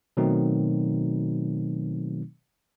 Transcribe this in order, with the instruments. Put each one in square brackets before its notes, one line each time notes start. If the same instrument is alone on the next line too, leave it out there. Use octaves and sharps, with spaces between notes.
[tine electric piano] B2 D#3 F#3 A3 C4 D#4